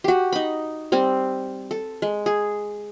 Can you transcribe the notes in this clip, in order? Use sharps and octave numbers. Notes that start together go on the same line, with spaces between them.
F#4 G4
D#4 B5
G3 C4
A4
G#3
G#4